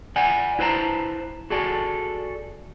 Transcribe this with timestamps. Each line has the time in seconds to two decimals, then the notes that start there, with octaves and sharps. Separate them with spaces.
0.16 D5 F#5 G#5
0.59 E4 B4 C5 A5 A#5
1.50 F#4 G#4 A4 D5